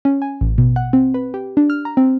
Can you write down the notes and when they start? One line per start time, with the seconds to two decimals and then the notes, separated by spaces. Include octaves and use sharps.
0.05 C#4
0.22 G#5
0.41 A1
0.58 B2
0.76 F#5
0.93 C4
1.14 B4
1.34 G4
1.57 D4
1.70 F6
1.85 A#5
1.97 C4